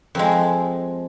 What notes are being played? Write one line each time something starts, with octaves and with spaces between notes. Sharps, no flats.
F2 F3 G#3